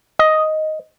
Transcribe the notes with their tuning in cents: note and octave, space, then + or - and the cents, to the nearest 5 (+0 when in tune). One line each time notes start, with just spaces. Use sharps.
D#5 +5